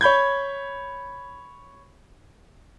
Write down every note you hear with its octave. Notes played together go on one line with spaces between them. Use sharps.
C#5 B5 G6 G#6